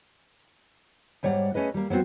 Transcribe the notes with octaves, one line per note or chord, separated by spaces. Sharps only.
G#2 G3 C#5 D5 F#5
A3 C#4 G#4 B4 D#5
G3 A#3
F#3 G3 B3 C4 F#4